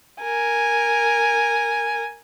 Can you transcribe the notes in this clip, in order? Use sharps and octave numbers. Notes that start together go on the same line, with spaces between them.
A#4 G#5